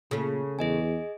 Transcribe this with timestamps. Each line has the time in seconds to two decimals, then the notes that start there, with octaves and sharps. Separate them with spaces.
0.11 A#2 C#3 A3
0.59 E2 G#4 D#5 G#5